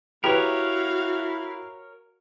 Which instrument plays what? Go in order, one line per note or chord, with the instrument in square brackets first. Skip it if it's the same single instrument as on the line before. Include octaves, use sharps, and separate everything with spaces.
[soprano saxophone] E4 [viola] F#4 F5 [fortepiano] G4 B4 [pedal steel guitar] A#4 C#5